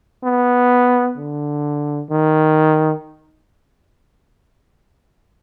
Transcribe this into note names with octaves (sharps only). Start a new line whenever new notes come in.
B3
D3
D#3